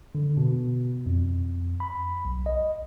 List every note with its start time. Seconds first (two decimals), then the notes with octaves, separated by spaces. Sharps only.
0.15 D3
0.37 B2
1.06 F2
1.80 B5
2.25 B1
2.46 D#5